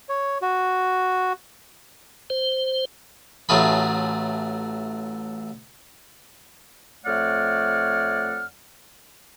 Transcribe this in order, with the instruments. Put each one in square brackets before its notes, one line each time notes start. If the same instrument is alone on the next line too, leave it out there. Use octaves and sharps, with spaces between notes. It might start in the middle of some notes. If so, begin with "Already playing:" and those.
[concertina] C#5
F#4
[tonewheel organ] C5
[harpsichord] A1 F#3 A3 F4 G#4 B5
[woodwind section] F2 A3 C#5 D5 F#5 F6